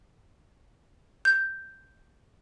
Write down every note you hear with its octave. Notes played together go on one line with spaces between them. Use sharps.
G6